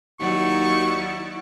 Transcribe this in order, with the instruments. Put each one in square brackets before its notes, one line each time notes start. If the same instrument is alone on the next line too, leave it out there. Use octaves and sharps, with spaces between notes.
[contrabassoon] D#2 [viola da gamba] F#3 D#4 [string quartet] E4 F#4 D5 [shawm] C#6